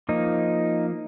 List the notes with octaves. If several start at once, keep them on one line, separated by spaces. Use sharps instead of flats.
F3 A#3 D#4